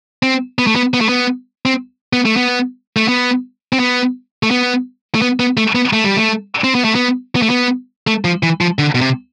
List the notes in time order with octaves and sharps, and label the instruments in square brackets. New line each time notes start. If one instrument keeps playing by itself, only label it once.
[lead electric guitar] C4
B3
A3
B3
B3
A3
B3
C4
B3
A3
B3
A3
B3
C4
B3
A3
B3
A3
B3
B3
A3
B3
A3
G3
A3
C4
B3
A3
B3
B3
A3
B3
A3
F3
E3
F3
D3
B2
C3